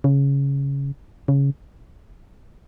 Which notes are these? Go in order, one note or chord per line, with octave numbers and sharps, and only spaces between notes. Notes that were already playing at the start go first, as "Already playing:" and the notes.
C#3
C#3